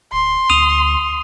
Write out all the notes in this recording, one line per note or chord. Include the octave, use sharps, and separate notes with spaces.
D1 C6
D2 D#6 D#7 F7